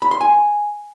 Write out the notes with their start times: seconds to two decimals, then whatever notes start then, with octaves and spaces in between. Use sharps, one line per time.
0.02 B5
0.11 C6
0.21 G#5